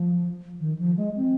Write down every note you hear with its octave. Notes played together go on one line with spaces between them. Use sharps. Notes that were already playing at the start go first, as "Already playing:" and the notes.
Already playing: F3
D#3
F3
G#3
C4